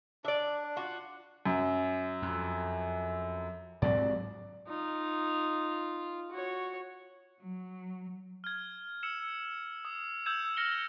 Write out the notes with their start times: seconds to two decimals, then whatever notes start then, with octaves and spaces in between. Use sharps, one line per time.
0.25 D4 D5 E5
0.76 F4 F#4
1.46 F#2
2.22 F2
3.82 G#2 F#3 C4 D5
4.67 D#4 F4
6.31 F#4 C#5
7.41 F#3
8.44 F6 G#6
9.03 E6 C#7 E7
9.85 D#6
10.26 E6 G6 G#6 E7
10.57 F6 A#6 C#7 G7